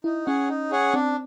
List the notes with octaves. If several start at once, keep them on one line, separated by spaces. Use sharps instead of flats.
D#4 E4
C#4 G#4 C#5 F#5
D#4
G#4 C#5 F#5
C4 D4